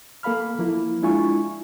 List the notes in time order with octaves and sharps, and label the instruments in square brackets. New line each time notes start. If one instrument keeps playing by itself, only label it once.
[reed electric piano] A#3 A4 F5 B5 F6
F3 A#3 E4
G#3 D4 E4 F4 G#5 C#6